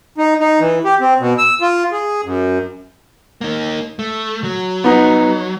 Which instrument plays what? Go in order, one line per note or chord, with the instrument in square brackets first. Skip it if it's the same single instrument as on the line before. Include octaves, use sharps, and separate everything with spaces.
[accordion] D#4
D#4
E3
G4
C4
B2
E6
F4
G#4
F#2
[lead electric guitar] A#3 D#4
A3
F#3
[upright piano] B3 D#4